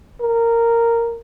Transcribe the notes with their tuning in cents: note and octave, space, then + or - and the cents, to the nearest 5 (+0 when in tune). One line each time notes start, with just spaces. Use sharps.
A#4 -10